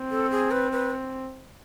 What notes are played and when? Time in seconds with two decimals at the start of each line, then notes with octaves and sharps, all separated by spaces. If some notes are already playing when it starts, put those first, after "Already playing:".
Already playing: C4
0.11 A4
0.31 G#4
0.51 B4
0.72 B4